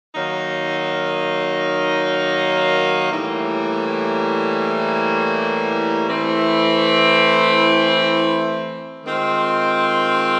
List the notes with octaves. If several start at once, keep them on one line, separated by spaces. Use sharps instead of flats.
D#3 F#3 A#3 D#4
A2 E3 G3 A#3
E3 A3 C4 E4
D#3 G#3 C4 F4